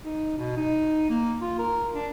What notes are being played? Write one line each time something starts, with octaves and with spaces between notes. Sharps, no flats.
D#4
B2
D#4
A#3
F4
A#4
D4